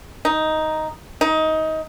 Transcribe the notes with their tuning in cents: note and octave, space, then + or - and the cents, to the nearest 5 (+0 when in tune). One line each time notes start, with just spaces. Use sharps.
D#4 +5
D#4 +20